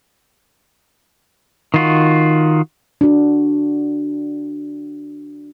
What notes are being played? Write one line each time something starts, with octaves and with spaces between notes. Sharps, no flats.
D#3 F4 F#4
D4 F#4